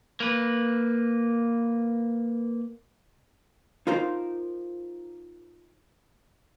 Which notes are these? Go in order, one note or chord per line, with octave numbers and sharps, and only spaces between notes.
A#3 B4
D#4 F4 A#4 C5